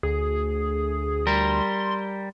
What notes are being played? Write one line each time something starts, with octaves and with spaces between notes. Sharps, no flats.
D2 G#4
G3 A#4 C6